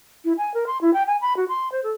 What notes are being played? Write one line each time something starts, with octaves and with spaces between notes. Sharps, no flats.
E4
G#5
A#4
C6
E4
G5
G#5
B5
F#4
C6
C5
A4